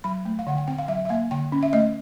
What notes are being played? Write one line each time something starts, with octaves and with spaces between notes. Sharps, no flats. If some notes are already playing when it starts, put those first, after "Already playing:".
F#3 B5
A3
F5
D3 F#5
G5
C4 G5
F5
F#3 E5
E5
A#3 F5
D3 G5
C#4
E5
A3 D#5